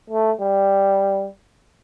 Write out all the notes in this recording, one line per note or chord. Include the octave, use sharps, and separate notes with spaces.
A3
G3